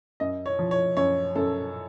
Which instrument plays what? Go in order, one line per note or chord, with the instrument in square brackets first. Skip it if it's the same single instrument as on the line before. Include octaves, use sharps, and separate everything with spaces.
[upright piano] F#2 D#5
C#5
F3
C#5
F#2 C#5
F#2 A4